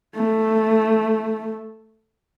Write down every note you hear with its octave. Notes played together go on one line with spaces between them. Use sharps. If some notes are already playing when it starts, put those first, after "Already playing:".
A3